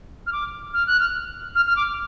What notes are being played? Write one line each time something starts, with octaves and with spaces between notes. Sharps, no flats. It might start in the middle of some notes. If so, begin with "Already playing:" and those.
F6
D6
F6
F#6
F6
F6
F6
D6